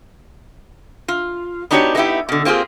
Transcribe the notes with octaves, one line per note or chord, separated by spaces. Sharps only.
F4
B3 D4 D#4 F#4 G4 C#5
G#3 A#3 B3 D#4 E4 G4
B2 D3
A#3 C4 F4 G4 G#4